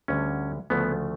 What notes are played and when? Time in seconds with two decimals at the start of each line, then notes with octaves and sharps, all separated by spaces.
0.08 D2 D3 G3 C#4
0.70 D2 C#3 F3 A3 B3